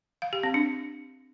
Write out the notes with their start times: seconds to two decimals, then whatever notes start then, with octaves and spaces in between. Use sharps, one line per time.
0.22 F5
0.33 G4
0.43 C4
0.54 D4